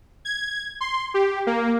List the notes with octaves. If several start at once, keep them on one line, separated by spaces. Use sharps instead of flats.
G#6
C6
G4
A#3